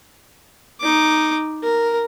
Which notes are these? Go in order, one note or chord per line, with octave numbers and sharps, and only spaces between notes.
D#4 D6
A#4